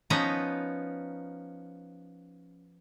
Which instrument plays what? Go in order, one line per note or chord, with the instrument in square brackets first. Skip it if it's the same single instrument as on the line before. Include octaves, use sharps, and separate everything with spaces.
[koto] F3 B3 C#4 D#4 B4 A#5